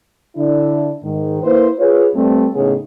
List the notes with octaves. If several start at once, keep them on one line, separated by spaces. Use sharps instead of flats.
D3 D4 E4
G#2 D#3
A#3 E4 B4 C5
F4 G#4 B4 C#5
G2 G3 A3 C4
A2 C#3 B3 D#4 G#4 C#5